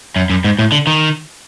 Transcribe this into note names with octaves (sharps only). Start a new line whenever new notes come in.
F#2
F#2
G#2
A2
D3
D#3